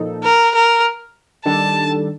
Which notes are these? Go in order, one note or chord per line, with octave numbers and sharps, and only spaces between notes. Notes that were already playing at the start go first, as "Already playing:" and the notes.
Already playing: A#2 F3 D#4 A4
A#4
A#4
D#3 G3 D4 A4 A5